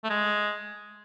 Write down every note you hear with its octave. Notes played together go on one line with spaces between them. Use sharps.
A3
G#3